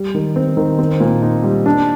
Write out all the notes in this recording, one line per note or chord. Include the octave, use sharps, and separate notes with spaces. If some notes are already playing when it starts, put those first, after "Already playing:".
Already playing: G3
D#3
C4
D#3
C4
A#2
D#4
G3
D4